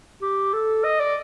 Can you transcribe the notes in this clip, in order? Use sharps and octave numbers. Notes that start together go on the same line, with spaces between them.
G4
A4
D#5
D5